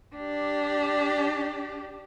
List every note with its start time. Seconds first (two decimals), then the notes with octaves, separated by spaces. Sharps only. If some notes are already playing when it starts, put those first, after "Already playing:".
0.16 D4 G4